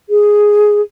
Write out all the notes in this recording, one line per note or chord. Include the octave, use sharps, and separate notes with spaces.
G#4